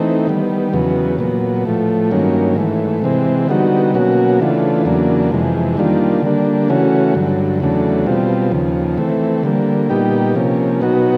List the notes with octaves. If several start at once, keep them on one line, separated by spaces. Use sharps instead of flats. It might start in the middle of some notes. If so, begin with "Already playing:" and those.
Already playing: E3 A3 C4 D#4
D#3 G3 B3
E2 C#3 F#3 B3
A#2 F#3 B3
A2 F3 A3
G2 D#3 F#3 A#3 C#4
G#2 E3 A3
C3 E3 G#3 C4
D3 G3 B3 D#4 F#4
B2 F#3 A#3 C#4 F#4
C#3 E3 A3 D4 F4
E2 C#3 F#3 A#3 D4
F2 C3 E3 G#3
D#3 G3 A#3 D4 F4
D3 G3 A#3 D4
C#3 E3 A3 C#4 F#4
G2 D3 F#3
E2 C#3 F#3 A3 D4
B2 G3 C4 F4
D#2 C#3 F3
E3 A3 C4
D3 G3 A#3
A#2 G3 B3 D#4 G4
C3 F3 A#3 C#4
B2 F#3 B3 D#4 F#4